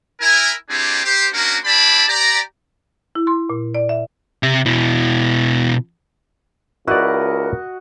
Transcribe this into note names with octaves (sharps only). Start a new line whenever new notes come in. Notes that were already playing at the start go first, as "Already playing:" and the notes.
E4 A#4 G#5
G3 C4 D4 E4 G4 G#4
G4 C5
A#3 C#4 D4 F#4 A#4
D4 E4 G4 D5 A5 B5
G4 D5 A#5
E4
C6
A#2
D5
E5
C3 E5
B2 E4
C#2 E4 F#4 A#4 B4 D5 D#5